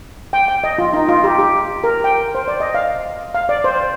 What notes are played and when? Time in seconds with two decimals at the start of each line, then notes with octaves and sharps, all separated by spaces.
0.33 G5
0.48 G5
0.64 D#5
0.78 F4
0.93 D#4
1.09 F4
1.24 G4
1.39 G4
1.84 A#4
2.04 G5
2.35 C5
2.48 D5
2.60 D#5
2.74 F5
3.34 F5
3.49 D5
3.64 C5